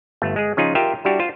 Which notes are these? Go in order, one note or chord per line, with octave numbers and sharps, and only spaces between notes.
G1 A3
G#3 G#4
C#3 F3 C#4 D#4 F4 G#4
F4 G4 A#4 E5 G5
G3 D4 E4 F#4 G4
F4 C5